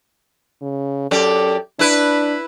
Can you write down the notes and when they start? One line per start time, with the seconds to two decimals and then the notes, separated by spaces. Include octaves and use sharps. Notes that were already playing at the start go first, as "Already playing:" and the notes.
0.62 C#3
1.11 F#2 G4 A4 D5
1.79 D4 E4 B4